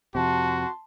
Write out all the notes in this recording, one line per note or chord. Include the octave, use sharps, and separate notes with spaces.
F2 C3 F#4 A5 C6